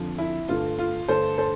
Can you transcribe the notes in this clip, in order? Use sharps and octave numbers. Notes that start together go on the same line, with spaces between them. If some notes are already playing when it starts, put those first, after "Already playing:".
Already playing: F2 D3 F3
E4
G2 D3 A3 F4
F4
G2 D3 A3 A4 C5
A4 C5